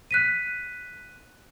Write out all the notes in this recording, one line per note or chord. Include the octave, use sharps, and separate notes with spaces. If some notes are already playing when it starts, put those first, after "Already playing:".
F#6 B6 D#7